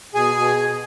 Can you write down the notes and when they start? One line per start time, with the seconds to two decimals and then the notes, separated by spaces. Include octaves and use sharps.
0.14 B2 G#4 G#5
0.35 B2
0.56 B2